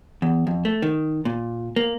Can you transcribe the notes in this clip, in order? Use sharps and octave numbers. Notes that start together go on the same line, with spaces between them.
E2
F2
A3
D#3
A#2
A#3